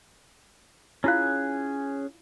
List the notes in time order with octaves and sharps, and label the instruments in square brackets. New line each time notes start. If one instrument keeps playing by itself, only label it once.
[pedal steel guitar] C#4 G#4 F#6 [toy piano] E4 F4 F5